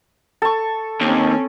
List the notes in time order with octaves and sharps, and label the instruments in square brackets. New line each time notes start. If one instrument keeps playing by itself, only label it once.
[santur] A4 C#6
[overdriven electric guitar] D#2 [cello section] C4 C#4